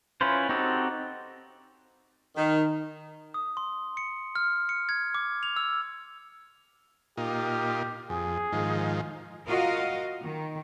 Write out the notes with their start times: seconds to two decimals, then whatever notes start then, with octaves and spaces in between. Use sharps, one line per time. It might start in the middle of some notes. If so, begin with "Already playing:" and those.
0.21 C#4 E4 F4 B4 C5
0.49 C4 D#4 F#4 G4 A4
2.37 D#3
3.34 D#6
3.57 C6
3.97 C#7
4.36 F6
4.69 C#7
4.89 G#6
5.14 D6
5.43 F7
5.56 E6
7.17 A#2 D#4 F4 G4
8.10 F2 G#4
8.52 G#2 D#3 F3
9.47 F4 F#4 A#4 D#5 F5
10.22 D#3